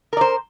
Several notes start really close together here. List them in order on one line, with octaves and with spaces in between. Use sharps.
A#4 D5 C5